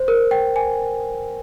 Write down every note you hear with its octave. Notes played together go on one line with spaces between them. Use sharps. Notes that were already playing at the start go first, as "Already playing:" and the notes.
Already playing: C5
A#4
G5
G#5